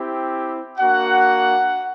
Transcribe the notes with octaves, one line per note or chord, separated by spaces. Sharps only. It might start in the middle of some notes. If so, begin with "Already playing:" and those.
Already playing: C4 E4 G4
A#3 D4 F#4 F#5